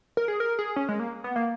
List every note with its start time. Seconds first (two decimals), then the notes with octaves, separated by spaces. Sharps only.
0.17 A#4
0.28 G#4
0.40 A#4
0.59 G#4
0.76 C#4
0.89 G#3
0.99 A#3
1.24 B3
1.36 A#3